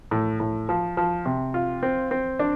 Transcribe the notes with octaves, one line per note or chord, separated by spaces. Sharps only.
A2
A2
F3
F3
C3
F4
C4
C4
D4